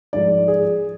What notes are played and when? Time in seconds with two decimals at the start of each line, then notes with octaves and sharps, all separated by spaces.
0.13 G#2 F3 G#3 D5
0.48 G#4